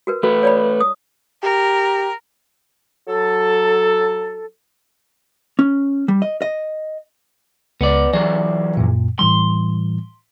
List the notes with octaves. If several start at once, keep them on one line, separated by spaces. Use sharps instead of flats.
F#4 A#4 B4
A3 F#4 A4 B4
C#5 D5 B5
D#6
G4 A#4
F#3 A4
C#4
G3
D#5
D#5
C#2 B3 D5
E3 F#3 G#4 D5
F#2 A#2
A2 E3 G3 C6